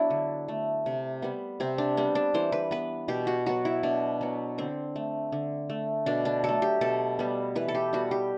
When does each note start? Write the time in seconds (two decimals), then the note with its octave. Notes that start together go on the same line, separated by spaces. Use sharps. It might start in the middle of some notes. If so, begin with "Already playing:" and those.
Already playing: F#3 B3 D4 E4
0.10 D3
0.48 A3
0.86 C3
1.22 G3 B3
1.60 C3 C4
1.78 D4
1.97 G3 B3 C4
2.15 D4
2.34 E3 C5
2.52 B4
2.71 B3 B4
3.08 B2 G4
3.27 F#4
3.46 F#3 B3 F#4
3.65 E4
3.83 B2 D4
4.21 F#3 B3
4.58 D3 C4
4.96 A3
5.32 D3
5.70 A3
6.06 B2 D4
6.25 D4
6.44 F#3 A3 A4
6.62 G4
6.81 B2 A4
7.19 G3 B3
7.55 E3 B4
7.68 A4
7.75 G4
7.93 G3 B3 F#4
8.11 G4